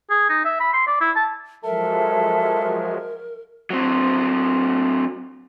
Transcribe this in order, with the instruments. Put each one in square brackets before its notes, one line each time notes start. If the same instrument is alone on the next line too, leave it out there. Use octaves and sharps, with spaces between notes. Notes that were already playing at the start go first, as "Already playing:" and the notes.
[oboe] G#4
D#4
E5
B5
C6
D5
E4
A5
[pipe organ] F3 F#3 G#3 [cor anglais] A4 [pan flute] A#4 [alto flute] E5
[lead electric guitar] F#3 C4